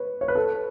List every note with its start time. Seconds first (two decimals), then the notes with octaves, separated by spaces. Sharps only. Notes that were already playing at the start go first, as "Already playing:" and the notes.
Already playing: B4 C#5
0.21 C#5
0.28 B4
0.35 A4